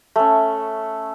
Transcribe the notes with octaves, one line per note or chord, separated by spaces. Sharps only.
A3 C#4